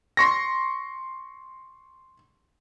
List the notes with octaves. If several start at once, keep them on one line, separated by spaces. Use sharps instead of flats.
C6 C#6 A#6